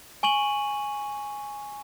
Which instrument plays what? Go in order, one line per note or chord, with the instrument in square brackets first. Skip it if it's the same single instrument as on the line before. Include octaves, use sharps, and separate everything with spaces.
[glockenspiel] G#5 C#6 D#7 F#7